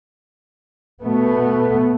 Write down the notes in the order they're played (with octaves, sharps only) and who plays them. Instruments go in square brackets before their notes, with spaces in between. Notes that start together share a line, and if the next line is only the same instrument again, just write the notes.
[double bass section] B2 A3 B3